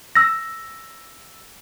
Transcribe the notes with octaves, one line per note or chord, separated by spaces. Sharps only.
E6 A#6